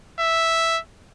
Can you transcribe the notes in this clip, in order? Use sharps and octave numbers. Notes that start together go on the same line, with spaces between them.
E5